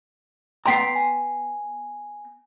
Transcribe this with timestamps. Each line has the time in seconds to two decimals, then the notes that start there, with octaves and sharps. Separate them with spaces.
0.66 B3 G5 A#5 C6 B6 C7
0.95 G#5